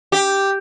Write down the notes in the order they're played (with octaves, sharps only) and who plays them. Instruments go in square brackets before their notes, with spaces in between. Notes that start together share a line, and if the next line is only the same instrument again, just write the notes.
[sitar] G4